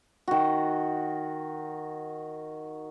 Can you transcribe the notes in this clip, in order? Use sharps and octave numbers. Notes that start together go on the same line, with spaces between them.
D#3 F#4